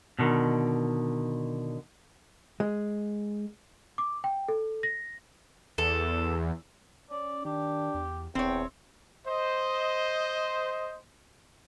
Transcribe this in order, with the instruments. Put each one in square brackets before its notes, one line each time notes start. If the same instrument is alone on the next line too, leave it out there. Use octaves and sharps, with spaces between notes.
[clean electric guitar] B2 D3 D#3
[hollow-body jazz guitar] G#3
[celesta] D6
G5
A4
A#6
[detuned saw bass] E2 [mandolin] A4
[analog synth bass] C#4 [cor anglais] D5
[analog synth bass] D#3 [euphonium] D4 [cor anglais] G4
[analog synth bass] E2
[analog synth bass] D#1 [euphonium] E2 [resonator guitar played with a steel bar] C4 C#5 [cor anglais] G5
[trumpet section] C5 D#5